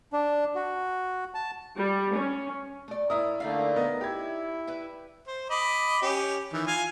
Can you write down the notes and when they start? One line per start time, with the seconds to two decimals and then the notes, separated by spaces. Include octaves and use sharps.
0.13 D4
0.55 F#4
1.34 A5
1.77 G3
2.16 C#4
2.88 A3 D5
3.10 A2 E4 A#4 D#6
3.40 D3 A3 A#3 D#4 D5 F5
3.76 B3 A#4 D#5
4.01 E4 G4 G#6
4.67 B4 E5
5.27 C5
5.50 D#5 B5 D6
6.02 C#4 G4
6.53 D#3 E3
6.67 F4 F5 G#5